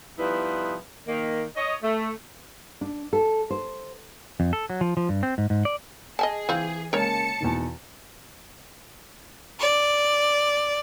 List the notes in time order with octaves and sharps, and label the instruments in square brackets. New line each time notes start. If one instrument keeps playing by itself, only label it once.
[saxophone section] F3 G3 B3 D#4 E4 B4
D#3 A#3
C#5 D#5
A3
[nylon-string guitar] D4
A4
C5
[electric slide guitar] F2
A4
F#3
F3
F3
G2
C4
G#2
G#2
D5
[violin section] G#4 [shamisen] D#5 G#5 A5
[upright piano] E3 [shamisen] C4 F4
[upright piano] C#3 G#3 A#3 [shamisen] A#4 C#5 [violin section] A5 C#7
[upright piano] E2 B2 D#3
[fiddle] D5